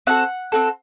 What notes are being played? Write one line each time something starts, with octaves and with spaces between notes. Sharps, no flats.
C4 F#4 A4 F#5
C4 F#4 A4